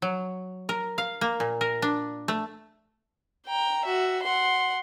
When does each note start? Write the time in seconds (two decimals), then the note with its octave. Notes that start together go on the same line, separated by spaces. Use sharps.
0.02 F#3
0.69 A#4
0.98 F5
1.21 A#3
1.40 A#2
1.61 A#4
1.82 D4
2.28 A3
3.47 G5 A#5
3.85 F#4 E5
4.22 F#5 C6